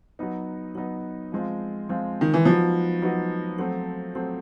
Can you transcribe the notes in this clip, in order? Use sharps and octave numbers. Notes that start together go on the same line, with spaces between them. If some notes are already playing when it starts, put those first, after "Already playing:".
F#3 B3 D#4
F#3 B3 D#4
F3 G#3 C4 F4
F3 G#3 C4 F4
D#3
E3
F3 F#3 B3 D#4 F#4
F#3 B3 D#4 F#4
F#3 A3 C4
F#3 A3 C4